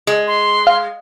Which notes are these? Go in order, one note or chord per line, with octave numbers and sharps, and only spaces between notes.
G#3
C6
F5